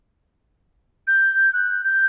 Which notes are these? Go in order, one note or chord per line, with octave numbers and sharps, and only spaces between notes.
G6
F#6
G6